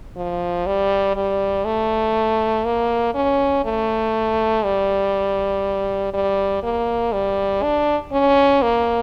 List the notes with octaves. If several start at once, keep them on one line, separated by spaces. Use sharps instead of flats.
F3
G3
G3
A3
A#3
C#4
A3
G3
G3
A#3
G3
D4
C#4
A#3